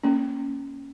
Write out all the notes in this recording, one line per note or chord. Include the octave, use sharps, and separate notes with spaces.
A#3 C#4